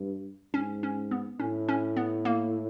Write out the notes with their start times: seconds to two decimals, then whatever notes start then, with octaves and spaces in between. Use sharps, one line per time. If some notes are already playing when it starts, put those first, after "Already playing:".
Already playing: G2
0.54 G#2 C#4
0.83 C#4
1.11 B3
1.40 A2 C#4
1.68 C#4
1.96 B3
2.25 A#3